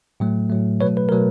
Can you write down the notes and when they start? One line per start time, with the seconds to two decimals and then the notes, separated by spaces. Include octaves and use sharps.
0.20 A2 F#3 A3
0.50 A2 F#3 A3
0.81 B2 F#3 A3 B4 C#5
0.97 B4
1.09 B2 F#3 A3 A#4